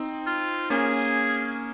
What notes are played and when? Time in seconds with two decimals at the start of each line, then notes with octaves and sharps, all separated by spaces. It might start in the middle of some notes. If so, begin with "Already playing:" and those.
Already playing: C4 D#4
0.27 F4
0.70 A#3 C#4 G#4